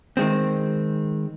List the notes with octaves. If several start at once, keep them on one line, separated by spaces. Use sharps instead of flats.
D#3 G#3 C4